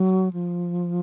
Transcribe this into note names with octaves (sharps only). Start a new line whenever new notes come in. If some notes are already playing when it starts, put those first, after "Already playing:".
Already playing: F#3
F3